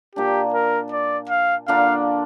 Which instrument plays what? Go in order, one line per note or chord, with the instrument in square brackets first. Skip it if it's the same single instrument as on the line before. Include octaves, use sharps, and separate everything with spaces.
[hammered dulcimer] A#2 A#3 D4 [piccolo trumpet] G4
[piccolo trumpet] A#4
D5
F5
[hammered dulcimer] D3 A#3 D4 F4 [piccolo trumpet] F5